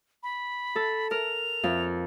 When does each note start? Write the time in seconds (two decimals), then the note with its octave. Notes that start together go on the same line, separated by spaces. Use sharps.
0.23 B5
0.76 A4
1.11 A#4 F7
1.63 F2